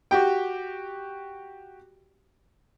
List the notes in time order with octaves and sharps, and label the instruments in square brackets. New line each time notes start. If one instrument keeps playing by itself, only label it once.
[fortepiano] F#4 G4 G5